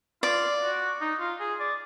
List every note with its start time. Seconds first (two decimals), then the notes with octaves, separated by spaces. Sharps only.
0.22 F4 D5
0.61 F#4
1.01 D#4
1.20 F4
1.40 G#4
1.60 D5